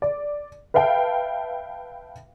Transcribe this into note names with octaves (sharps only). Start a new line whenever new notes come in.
D5
B4 E5 F5 G5 A5